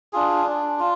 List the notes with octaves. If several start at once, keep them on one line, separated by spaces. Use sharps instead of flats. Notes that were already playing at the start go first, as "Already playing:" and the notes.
D4 F4 G#4
D4
F4